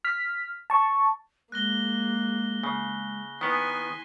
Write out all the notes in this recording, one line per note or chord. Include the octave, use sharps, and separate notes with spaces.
F6 B6
A5 C#6
G#3 A#3 F#6 A#6 G7
C#3 G#3
D#3 B3 E4 G#5 C6 B6